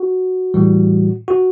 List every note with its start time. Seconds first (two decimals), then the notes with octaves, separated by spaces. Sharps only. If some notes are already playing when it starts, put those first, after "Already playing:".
Already playing: F#4
0.54 A2 E3 G3
1.28 F#4